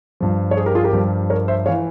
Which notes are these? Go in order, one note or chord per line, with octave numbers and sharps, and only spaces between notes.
G2 F3
C#5
G#4 C5
G4 A#4
F4 G#4
G4 A#4
G2 F3
A#4 C#5
C5 E5
E3 C#5 F5